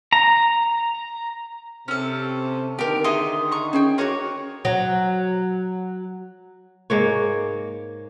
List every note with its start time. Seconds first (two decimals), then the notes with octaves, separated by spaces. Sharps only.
0.13 A#5
1.88 C3 C#4 A4
2.79 D3 D#3 G4 A#4
3.04 D#4 G#4 D#5 E5 C6
3.51 A#5 C#6
3.73 C#4 G#4 G5 G#5
3.98 A#3 F#4 G#4 C#5 A#5
4.65 F#3
6.90 G#2 A#3 C#5